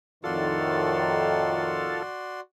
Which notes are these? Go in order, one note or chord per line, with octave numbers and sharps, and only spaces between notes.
F2 A2 D#3 F4 F#4 A4 D5 C6